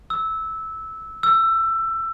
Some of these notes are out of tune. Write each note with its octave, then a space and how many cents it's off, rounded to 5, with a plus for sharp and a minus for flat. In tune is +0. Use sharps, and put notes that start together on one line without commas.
E6 -15
E6 +20